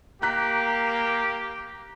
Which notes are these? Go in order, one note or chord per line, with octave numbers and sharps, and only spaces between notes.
A#3 G4 A#5 F#6 B6